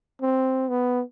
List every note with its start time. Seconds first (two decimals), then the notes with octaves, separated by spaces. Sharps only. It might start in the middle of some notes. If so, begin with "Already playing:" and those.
0.22 C4
0.69 B3